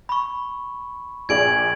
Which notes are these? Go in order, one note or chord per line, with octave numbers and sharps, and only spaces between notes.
B5 C#6
A#1 G#4 D5 G#6 D7 F#7